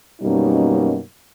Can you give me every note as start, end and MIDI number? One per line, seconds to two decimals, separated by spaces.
0.21 0.99 42
0.21 0.99 47
0.21 0.99 55
0.21 0.99 58
0.21 0.99 61
0.21 0.99 63